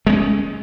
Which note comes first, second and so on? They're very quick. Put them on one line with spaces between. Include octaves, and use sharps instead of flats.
G#3 B3 C#4